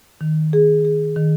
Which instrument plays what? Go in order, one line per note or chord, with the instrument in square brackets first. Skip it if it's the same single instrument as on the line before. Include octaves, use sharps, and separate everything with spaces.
[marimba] D#3
G#4
G#4
D#3